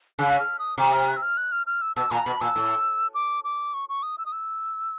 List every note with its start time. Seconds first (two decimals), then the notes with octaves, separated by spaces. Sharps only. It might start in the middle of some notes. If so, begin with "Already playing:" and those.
0.19 C#3 F#6
0.39 F6
0.59 D#6
0.78 C3 D6
0.93 F6
1.08 F#6
1.17 E6
1.22 F6
1.37 F#6
1.52 F6
1.67 F6
1.82 E6
1.96 B2 E6
2.11 A#2 A#5
2.25 B2 B5
2.41 A#2 E6
2.56 A2
3.14 D6
3.44 D6
3.74 C#6
3.89 C#6
4.03 D#6
4.18 E6
4.26 D#6
4.32 E6